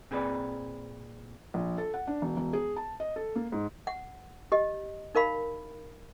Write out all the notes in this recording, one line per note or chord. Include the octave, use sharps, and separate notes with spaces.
A#2 C4 G#4 B4 D5
A#1
A4
F#5
D4
E1
E1
G#4
A5
D#5
A4
A#3
G#2
F#5
G4 D#5
D#4 A#4 F5 B5